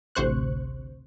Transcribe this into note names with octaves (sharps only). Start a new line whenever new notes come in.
A1 D2 C3 C5 C#6 F#6